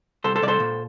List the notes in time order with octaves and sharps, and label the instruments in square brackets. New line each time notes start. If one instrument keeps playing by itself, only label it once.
[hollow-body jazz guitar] C2 A4 C5
A4 C5
C2 D5
A4 C5
A#2